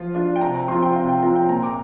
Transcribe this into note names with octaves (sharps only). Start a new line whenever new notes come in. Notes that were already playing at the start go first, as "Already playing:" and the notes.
Already playing: F3 F4
D4 F4
G5
C3 A#5
A#5
F3 C4 F4 C6
G5
C3 F5
G5
F3 C4 F4 A#5
G5
A#2 A#5
D6